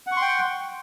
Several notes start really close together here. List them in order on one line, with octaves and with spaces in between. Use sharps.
F#5 C#6 C6 G5